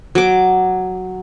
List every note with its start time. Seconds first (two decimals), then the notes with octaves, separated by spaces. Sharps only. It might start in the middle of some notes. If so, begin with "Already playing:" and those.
0.15 F#3 D6